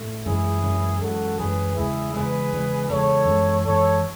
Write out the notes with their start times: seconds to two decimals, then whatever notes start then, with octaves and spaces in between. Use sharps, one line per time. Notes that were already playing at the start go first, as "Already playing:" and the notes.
Already playing: A2 A3
0.26 F#2 E3 G#3 E4 G#4
0.63 F#2 E3 G#3
1.01 F#2 E3 G#3 F#4 A4
1.39 F#2 E3 G#3 G#4 B4
1.76 E2 C#3 G#3 E4 G#4
2.14 E2 C#3 G#3 G#4 B4
2.52 E2 C#3 G#3
2.89 E2 C#3 G#3 A4 C#5
3.27 F#2 E3 G#3 B3
3.65 F#2 E3 G#3 B3 A4 C#5